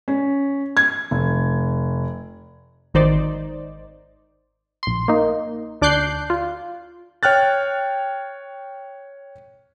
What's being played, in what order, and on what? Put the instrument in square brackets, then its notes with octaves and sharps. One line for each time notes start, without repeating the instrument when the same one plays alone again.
[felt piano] C#4
G#6
F1
[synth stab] G#1 D#3 D#4 C5 D5
A#1 C6
A#3 D#4
D2 D4 D6 F#6 G6 C7
F4
[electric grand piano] C#5 G5 F6 F#6 A6